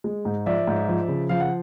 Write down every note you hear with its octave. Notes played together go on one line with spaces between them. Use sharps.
G#3
G#2
F3 D5 E5
G#2
F3
C#3
F3 F5
F#5